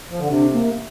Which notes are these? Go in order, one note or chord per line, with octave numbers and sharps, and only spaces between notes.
F3
D3
C3 D4
A#3